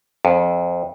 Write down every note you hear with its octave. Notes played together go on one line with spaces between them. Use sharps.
F2